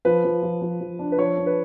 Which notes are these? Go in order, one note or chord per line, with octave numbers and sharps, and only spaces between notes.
F3 B4
F3
F3
F3
F3
D4
B4
F3 C#5
D4
B4